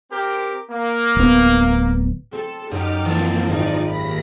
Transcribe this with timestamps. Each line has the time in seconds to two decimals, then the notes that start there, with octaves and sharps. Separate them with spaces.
0.12 C4 G4 A#4
0.71 A#3
1.17 D1 B3
2.33 C4 A4
2.72 F#2 C#3 D#4 G4 D6 F6
3.05 E3 F3 A#3 C4 D4 A4
3.48 G#1 F3 D#4 D5
3.89 D#2 B5 A#6 B6